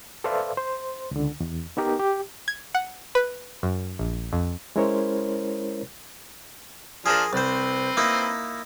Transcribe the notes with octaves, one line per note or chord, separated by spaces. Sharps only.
A4 B4 C5 D5 E5 F5
C5
C#2 D3
E2
B3 D#4 G4 A#4
G4
G#6
F#5
B4
F#2
A#1
F2
G#3 C#4 E4 A#4 C5 C#5
F3 D4 G#4 A#4
C2 C4 B4 C5
A#3 D#4 E4